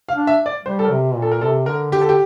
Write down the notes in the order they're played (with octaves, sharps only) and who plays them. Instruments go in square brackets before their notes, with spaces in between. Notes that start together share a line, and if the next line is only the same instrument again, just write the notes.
[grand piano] F5
[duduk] D4
[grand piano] E5
D5
[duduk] G3 [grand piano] C5
[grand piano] A4
A#4
[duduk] C3
A#2
[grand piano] A4
A#4
[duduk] C3 [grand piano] A4
[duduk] D3 [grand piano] A#4
[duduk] D3 [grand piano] G4
[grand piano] A4
G4